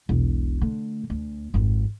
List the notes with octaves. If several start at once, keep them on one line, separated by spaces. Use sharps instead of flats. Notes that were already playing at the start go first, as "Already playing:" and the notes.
E1 B1
D3 A3
D2
G#1 F2